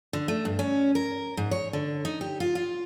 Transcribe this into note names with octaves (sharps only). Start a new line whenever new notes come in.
D3
A3
G2
C#4
A#4
G#2
C#5
D3
D#4
G4
F4
F4